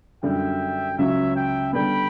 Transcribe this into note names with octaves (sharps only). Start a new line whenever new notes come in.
F#2 D3 G3 E5 G5
C#2 C#3 F#3 C#5 E5
E5 G5
D3 G3 B3 G5 B5